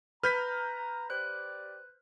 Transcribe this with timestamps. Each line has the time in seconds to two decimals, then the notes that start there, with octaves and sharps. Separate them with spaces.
0.23 B4 A#5 F6 G6 B6
1.10 G4 C5 D5 F#6